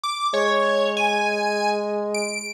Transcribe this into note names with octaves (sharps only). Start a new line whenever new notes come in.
D6
G#3 C#5
G#5
D7